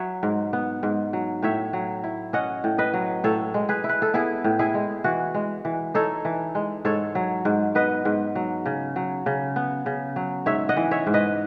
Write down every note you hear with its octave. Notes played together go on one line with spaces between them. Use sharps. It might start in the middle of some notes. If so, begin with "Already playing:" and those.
Already playing: F#3 C#5 E5
G#2
B3
G#2
F#3
A2 C#5 E5
F#3
E4
C#4 D#5 F#5
A2
B4 D#5
F#3
A2 A4 C#5
G#3
G#4 B4
E4
B4
A4
B3 E4 G#4
A2
E4 G#4
G#3
E3 F#4
G#3
E3
D#4 A4 C#5
E3
G#3
G#2 A4 C#5
F#3
G#2
B3 B4 D#5
G#2
F#3
C#3
F#3
C#3
B3
C#3
F#3
G#2 C#5 E5
D#5 F#5
E3
C#5 E5
G#2
B4 D#5